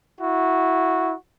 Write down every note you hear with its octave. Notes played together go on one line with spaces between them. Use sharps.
E4 F#4